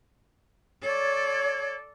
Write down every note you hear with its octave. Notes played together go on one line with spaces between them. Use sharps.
A4 C#5 D5